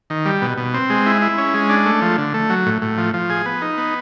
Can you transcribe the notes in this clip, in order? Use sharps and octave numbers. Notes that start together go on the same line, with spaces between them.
D#3
G3
B2
B2
C4
G#3
E4
E4
C#4
G#3
D4
A3
F3
D3
A3
F#3
A2
A2
F3
F3
G#4
B3
D#4
B3